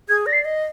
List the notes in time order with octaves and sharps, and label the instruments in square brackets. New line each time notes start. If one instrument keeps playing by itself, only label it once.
[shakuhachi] G#4 [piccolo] G#6
[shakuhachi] D5 [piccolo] A#6
[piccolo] C7
[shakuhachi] D#5